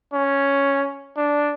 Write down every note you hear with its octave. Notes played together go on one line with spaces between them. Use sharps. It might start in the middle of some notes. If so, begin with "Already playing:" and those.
C#4
D4